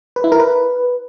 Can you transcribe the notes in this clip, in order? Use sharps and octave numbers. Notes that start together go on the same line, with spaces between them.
B4
E4
A#4
B4